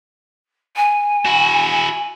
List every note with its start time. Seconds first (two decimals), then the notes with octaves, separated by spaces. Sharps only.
0.76 G#5
1.25 E4 F#4